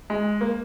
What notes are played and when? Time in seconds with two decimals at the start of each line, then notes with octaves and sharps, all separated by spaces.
0.10 G#3
0.41 A#3